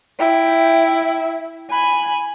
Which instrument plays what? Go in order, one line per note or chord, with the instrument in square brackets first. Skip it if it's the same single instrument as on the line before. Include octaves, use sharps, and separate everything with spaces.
[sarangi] E4 [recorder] G5
[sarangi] G#5 [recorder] B5